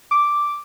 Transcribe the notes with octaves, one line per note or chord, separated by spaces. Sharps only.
D6